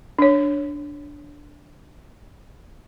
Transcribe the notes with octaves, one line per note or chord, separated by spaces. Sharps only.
D4 C#5